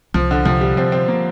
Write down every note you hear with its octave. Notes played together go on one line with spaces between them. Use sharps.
C2 F3
D3
C3 F3
G3
F3 C4
C4
A#3